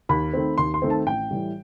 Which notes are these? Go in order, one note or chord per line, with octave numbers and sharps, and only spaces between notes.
D#2 B5
D#3 A3 C4
D#2 C6
C6
D#3 A3 C4
A5
A1 G5
A2 E3 G3